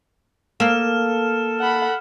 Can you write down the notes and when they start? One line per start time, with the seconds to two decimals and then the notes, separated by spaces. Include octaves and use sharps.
0.60 A#3 A4 F6 E7
1.60 F#5 B5